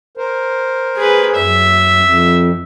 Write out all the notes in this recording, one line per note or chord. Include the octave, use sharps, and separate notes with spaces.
A#4 C5
G#4 B4
F#2 E5
F2